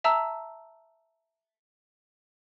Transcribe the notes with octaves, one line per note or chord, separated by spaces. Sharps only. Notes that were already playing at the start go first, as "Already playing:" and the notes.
E5 A5 A#5 E6